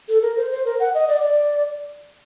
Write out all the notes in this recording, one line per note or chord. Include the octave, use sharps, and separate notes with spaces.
A4
A#4
C5
C5
A#4
F#5
D#5
D5
D5